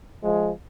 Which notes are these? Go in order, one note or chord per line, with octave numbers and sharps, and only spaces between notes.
F3 G#3